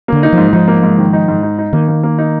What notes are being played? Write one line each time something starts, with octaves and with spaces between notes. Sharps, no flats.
D3 A#3
D#4
F3
G#2
F3 D#4
A#3
G#2
D#3
D#4
G#2
D#4
D#4
D#3 A#3
A#3
A#3
D#4